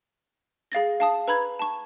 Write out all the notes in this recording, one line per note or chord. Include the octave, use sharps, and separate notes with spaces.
G#4 F5 A6 A#6
F5 A5 D#6
B4 A#5 B5 G#6
A5 C#6